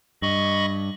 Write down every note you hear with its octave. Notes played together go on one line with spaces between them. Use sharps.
G2 D#5 B5 C#6